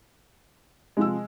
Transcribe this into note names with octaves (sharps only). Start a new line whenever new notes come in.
C3 F3 G#3 E6